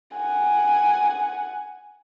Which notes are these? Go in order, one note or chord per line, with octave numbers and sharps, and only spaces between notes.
F#5 G#5